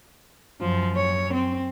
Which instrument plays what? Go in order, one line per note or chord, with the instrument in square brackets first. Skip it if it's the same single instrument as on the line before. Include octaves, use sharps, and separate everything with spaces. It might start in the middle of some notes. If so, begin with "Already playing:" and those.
[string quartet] F#2 [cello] F3
[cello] C#5
C4